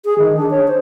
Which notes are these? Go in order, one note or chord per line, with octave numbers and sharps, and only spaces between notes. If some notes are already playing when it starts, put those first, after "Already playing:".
G#4
D#3
D4
C#5
C5